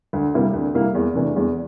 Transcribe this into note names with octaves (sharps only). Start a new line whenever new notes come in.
D2
C3 G3 A#3 E4
D2
C3 G3 A#3 E4
E2
C3 E3 A3 D4
E2